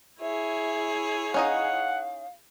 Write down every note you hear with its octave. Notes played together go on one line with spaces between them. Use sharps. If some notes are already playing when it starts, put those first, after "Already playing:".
E4 G#4 C#5 E5
C#4 D#4 D#5 F5 F#5